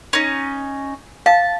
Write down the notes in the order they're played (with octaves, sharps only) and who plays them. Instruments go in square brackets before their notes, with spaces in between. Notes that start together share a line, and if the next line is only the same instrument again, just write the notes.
[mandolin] C#4 D#4
[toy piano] F5 [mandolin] A5